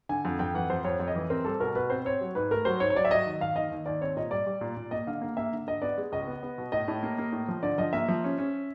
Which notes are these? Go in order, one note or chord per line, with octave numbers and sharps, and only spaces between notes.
D3 G#5
F2
F2 G5
E3 F#5
F2 C5
F2 C#5
F2
D#5
E3
C4 A#4
G3 A4
B2 A#4
B2 B4
C4 C5
C4 C#5
F#3
G#2 B4
A3 A#4
F#3 C5
G#2 C#5
C#5
F#3 D5
E5
F#3 D#5
D#2
D#2 F5
D#2 D#5
D#2
D#2 D5
C4 C#5
A#2 D#5
G3 D5
G3
A#2
A#2
A#3 D#5
D3 F5
A#3
A#3 E5
D3
D3 D#5
B3 D5
G#3
C#2 D#5
B3
B3
B2
A2 D#5
A2
A#3
A#3
A2
F3
D3 D5
F3 D#5
A#3 E5
F3
C#4
C#4